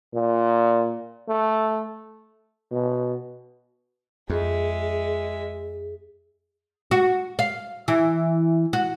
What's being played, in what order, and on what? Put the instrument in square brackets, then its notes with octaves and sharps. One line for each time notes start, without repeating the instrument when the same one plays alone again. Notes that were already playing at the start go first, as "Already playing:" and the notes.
[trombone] A#2
A3
[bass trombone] B2
[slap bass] F2 [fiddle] G#3 E5 [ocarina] G#4
[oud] F#4
F5
E3
F#4